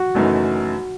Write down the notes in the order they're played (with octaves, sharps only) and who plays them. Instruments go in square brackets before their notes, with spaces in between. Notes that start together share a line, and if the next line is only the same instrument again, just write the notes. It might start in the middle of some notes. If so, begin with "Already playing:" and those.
Already playing: [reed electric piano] F#4
[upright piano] F#1 F#2 E3 A3 D#4